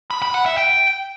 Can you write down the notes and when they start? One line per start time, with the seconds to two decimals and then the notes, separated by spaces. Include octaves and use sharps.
0.11 B5
0.22 B5
0.34 F#5
0.46 E5
0.58 G5